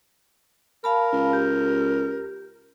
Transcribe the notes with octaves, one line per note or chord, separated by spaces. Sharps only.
A#4 F5 A5 B5
C#2
G4